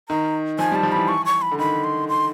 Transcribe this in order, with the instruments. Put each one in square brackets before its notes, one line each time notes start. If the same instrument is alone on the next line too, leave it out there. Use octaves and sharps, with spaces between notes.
[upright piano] D#3 [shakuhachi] A#5
[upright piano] F3 [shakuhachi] G#5
[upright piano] G3
[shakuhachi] A5
[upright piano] F3
[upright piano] E3 [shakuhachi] B5
[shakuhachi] C#6
C#6
B5
[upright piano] D3
[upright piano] D#3 [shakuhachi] B5
[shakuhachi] C6
C6